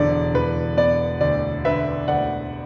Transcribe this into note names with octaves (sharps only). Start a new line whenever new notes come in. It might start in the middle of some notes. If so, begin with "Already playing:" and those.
Already playing: E1 D3 D5
E1 B4
B3 D5
D2 D5
D3 B4 E5
D2 D5 F#5